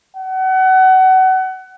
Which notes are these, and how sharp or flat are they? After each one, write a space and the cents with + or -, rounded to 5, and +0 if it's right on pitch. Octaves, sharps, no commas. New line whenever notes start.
F#5 +30